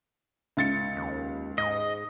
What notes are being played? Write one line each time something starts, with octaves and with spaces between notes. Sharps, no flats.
C#2 A6 C#7
D#2
G#2 D#5